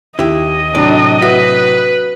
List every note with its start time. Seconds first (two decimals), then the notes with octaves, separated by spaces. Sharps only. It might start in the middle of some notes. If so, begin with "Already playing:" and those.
0.19 D#2 E4 G4 D#5
0.75 A2 C3 F#3 D4 D5
1.22 F#4 B4 E5